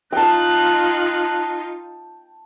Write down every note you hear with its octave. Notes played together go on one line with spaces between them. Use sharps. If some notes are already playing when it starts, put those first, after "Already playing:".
D#4 F4 G5 A5 F#6